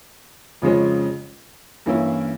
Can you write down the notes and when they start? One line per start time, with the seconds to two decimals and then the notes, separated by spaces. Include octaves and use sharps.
0.62 F2 C#3 F3 G#3 C#4
1.86 G2 E3 A#3 C#4 E4